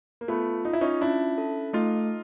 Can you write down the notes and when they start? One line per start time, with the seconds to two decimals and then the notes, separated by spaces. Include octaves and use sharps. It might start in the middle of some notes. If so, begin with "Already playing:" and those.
0.21 A#3
0.28 A3 B3 F4
0.65 D#4 F4
0.73 E4
0.81 C#4 D#4
1.01 C#4 D4 E4
1.38 A4
1.73 A3 D#4 F4